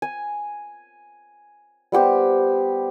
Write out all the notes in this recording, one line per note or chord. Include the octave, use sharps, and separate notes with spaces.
G#5
G3 B3 G4 C5